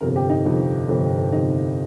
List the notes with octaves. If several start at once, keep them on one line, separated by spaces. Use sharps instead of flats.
G1 F2 C3 A#4
G4
D#4
G1 F2 C3
G1 F2 C3
G1 F2 C3 D#4